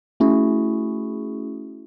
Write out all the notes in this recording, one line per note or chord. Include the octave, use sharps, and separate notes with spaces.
A3 C#4 E4 F#4 G#4